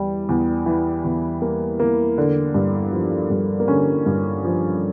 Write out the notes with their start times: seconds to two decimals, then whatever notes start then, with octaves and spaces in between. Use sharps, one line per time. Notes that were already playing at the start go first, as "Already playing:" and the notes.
Already playing: E2 E3 G3
0.29 E2
0.66 E3
1.05 E2
1.41 G3 A#3
1.80 E2 A#3
2.18 D3
2.54 G2
2.92 F3
3.30 G2
3.60 A#3
3.68 D3 C#4
4.06 G2
4.44 F3